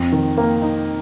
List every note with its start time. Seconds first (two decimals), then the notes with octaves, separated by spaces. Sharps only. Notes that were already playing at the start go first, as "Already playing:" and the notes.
Already playing: F2
0.12 D#3
0.38 A#3
0.62 D#4